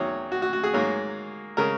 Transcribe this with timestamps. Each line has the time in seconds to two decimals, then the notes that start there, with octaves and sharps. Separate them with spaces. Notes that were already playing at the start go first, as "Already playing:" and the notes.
Already playing: E2 D#3 F#3 C#5
0.32 F#4
0.42 F#4
0.53 F#4
0.63 G#4
0.74 G#2 F#3 A#3 C#4
1.57 C#3 G#3 C#4 A#4